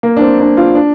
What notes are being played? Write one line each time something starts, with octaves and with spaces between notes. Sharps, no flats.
A#3
D4
C4
D4
F4
D4